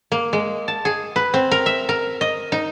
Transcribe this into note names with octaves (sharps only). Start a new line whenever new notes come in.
A#3
G#3
A5
G#4
B4
C4
A#4
E5
A#4
D#5
D#4